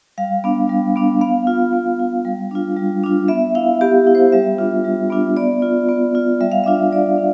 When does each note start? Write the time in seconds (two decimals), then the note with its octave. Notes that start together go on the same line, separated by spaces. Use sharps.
0.18 G3 F5
0.44 B3 D4
0.69 G3
0.96 B3 D4
1.21 B3 F5
1.47 F4
1.73 B3
1.99 F4
2.25 G3
2.51 D4 F4
2.76 G3
3.03 D4 F4
3.28 B3 E5
3.55 E4 F5
3.81 B3 G4
4.07 E4
4.15 C5
4.32 G3 E5
4.59 B3 D4 F4
4.85 G3
5.10 B3 D4 F4
5.37 B3 D5
5.62 F4
5.89 B3
6.15 F4
6.40 G3 E5
6.52 F5
6.64 D4 F4 E5
6.92 G3 D5
7.18 D4